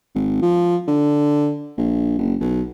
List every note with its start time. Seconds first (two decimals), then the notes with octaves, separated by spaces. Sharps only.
0.15 G#1
0.42 F3
0.88 D3
1.77 A#1
2.18 F#1
2.41 B1